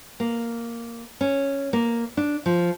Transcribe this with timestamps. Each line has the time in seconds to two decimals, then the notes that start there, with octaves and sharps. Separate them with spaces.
0.20 A#3
1.21 C#4
1.73 A#3
2.17 D4
2.46 F3